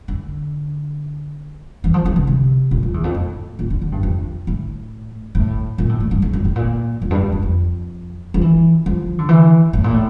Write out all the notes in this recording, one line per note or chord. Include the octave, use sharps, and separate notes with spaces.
D3
E3
F3
E3
C3
C3
A#2
F2
E2
F2
A2
A#2
D3
D3
G2
F2
A2
A2
A#2
A2
A2
G2
E2
F2
A2
A#2
F2
G2
F2
F2
F2
F3
E3
F3
D3
E3
A2
A#2
A2